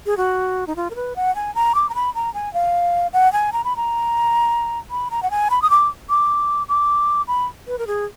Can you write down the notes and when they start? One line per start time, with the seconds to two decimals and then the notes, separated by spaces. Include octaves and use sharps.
0.06 G#4
0.17 F#4
0.67 D#4
0.76 F4
0.90 A#4
0.96 B4
1.16 F#5
1.36 G#5
1.55 A#5
1.75 D6
1.89 A#5
1.95 B5
2.15 A#5
2.34 G#5
2.54 F5
3.13 F#5
3.33 G#5
3.53 A#5
3.64 B5
3.76 A#5
4.91 B5
5.11 A#5
5.23 F#5
5.31 G#5
5.51 B5
5.62 D#6
5.70 D6
6.10 D6
6.69 D6
7.28 B5
7.68 B4
7.78 A#4
7.87 G#4